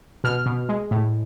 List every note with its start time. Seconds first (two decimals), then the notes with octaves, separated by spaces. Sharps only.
0.24 B2 F6
0.46 B2
0.69 G#3
0.91 A2